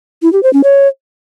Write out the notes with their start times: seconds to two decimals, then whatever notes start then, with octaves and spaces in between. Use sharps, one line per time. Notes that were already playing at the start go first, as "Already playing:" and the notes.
0.22 E4
0.33 G4
0.43 C5
0.53 C#4
0.64 C#5